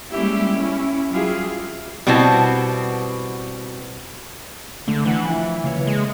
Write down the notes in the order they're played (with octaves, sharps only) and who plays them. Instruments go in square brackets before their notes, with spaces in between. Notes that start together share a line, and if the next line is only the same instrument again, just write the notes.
[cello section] G3 G#3 A#3 C#4 E4 G4
C#4 E4
F#3 G3 E4 F4 G4 G#4
[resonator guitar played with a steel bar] B2 G3 B3 C4 E4 A5
[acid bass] D3 [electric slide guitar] A3
[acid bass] E3 [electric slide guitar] D4 F#5
[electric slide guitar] F3 E4
C#3 A#3 C#5
[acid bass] G#3